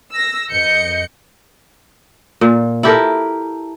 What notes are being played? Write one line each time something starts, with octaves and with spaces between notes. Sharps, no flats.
E6 A#6
F2 D#5 G6 C#7
A#2
E4 G4 A4 A#4